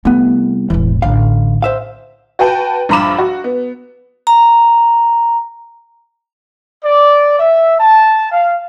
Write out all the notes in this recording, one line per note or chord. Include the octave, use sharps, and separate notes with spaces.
C2 A3 B3
E1 A1 E3
A1 D3 F5
C5 E5 F5
F#4 B4 G5 A5
A#1 G2 A#5 B5 D6 E7
F#4
B3
A#5
D5
E5
A5
F5